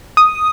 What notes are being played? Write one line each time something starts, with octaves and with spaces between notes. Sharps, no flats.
D#6